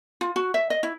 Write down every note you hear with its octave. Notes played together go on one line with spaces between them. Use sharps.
F4
F#4
E5
D#5
E4